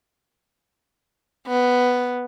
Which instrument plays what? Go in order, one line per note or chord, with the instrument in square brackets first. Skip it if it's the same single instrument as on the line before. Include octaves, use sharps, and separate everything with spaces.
[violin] B3